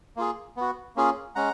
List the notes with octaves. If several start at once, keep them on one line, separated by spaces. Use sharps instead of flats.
A#3 F4 G#4
B3 F#4
A#3 C#4 F4 G#4
G#3 C#4 F#5 A#5